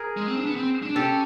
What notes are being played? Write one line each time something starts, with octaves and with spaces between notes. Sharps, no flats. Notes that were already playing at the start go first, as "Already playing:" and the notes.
Already playing: G#4 A#4
G#3
C4
D4
B3
C4
D4
C#4 G4 A4